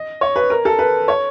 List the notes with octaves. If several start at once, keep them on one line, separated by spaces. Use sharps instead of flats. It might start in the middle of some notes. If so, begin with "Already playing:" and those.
Already playing: D#5
C#5
B4
A#4
A4
B4
C#5